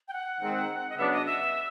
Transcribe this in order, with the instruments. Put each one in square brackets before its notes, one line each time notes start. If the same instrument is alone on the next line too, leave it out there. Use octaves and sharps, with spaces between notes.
[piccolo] G5
F#5
[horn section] D#3 G#3 C4
[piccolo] D#5
[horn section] C#3 F#3 B3 D4 [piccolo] E5
[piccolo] D#5
E5